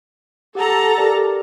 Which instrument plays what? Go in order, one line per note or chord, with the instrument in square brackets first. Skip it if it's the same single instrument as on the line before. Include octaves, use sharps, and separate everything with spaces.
[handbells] G4 F#5 [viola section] A4 A5 A#5
[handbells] G4 A#4 D5